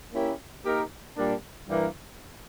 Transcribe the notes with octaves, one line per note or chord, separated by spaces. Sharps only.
A#3 C#4 E4 G4 A#4
A#3 D#4 G4 A#4
A#2 G3 A#3 D4
G2 E3 G3 A#3